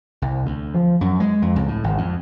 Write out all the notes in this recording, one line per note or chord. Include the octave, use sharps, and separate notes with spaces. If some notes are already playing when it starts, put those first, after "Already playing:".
C2
D2
F3
F#2
G#3
F2
C#2
A2
G#1
F2